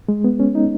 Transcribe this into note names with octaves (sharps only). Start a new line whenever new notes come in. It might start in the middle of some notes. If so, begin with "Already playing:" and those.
G#3
B3
C#4
D#4